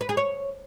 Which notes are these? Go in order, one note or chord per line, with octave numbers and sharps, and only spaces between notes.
B4
G#4
C#5